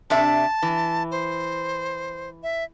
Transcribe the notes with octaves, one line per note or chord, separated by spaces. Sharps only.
C3 D4 E5 A5
E3
C5
E5